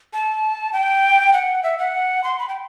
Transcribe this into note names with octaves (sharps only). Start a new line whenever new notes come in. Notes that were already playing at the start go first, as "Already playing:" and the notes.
A5
G5
F#5
E5
F#5
C6
B5
G5